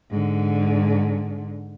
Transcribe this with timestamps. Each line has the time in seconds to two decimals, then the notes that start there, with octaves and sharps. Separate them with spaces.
0.10 G#2 D3